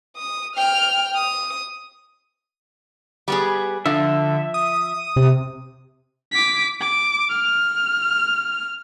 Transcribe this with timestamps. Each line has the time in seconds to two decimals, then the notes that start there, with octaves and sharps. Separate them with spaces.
0.17 D#6
0.56 G5 F6
1.15 D#6
3.28 G3 B3 G#4
3.86 D3 F3 E5
4.54 D#6
5.16 C3
6.32 D6 B6
6.81 D6
7.30 F6